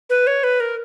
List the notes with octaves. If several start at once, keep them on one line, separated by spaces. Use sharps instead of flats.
B4
C#5
B4
A#4